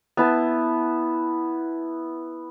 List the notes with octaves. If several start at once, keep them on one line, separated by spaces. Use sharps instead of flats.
B3 E4 A5